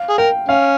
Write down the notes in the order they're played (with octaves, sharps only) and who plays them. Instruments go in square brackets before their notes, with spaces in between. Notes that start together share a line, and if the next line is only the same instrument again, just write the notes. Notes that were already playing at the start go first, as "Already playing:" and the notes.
Already playing: [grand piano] F5
[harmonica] G#4
[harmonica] A#4 [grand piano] G5
[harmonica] C#4 [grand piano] F5